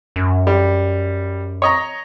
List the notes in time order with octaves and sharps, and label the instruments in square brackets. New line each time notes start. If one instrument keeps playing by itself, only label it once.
[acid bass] F#2
[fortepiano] G3
C#5 D#5 A#5